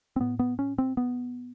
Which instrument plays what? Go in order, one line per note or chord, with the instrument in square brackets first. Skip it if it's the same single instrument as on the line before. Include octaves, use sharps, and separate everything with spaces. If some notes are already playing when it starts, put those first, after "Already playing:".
[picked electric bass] C4
A2 B3
B3
C#4
C4
B3